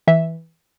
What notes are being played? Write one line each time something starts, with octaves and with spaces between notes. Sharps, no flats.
E3 E5